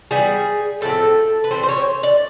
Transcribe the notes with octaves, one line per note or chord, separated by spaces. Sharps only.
E3 G3 B3 G#4
A2 F3 A3 C4 A4
B4
E3 G3 C4 C5
C5
C#5
D5